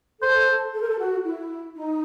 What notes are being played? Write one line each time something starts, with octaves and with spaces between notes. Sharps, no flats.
A4 C5
A4
A#4
A4
F#4
E4
D#4